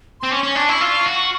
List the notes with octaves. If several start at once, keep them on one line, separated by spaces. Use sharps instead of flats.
C4 C6
C#4 D6
C#6
C#4
D4
E4
F4
F#4